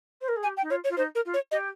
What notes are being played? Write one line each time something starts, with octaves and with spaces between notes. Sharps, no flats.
C5
A#4
G#4
G4 G#5
G5
D#4
F4 C#5
C#5
F4
D#4 C5
A#4
F4
C#5
G4 D#5